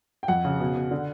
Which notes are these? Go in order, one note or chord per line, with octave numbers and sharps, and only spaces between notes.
G5
F2 F#5
C#3
B2
B2
D3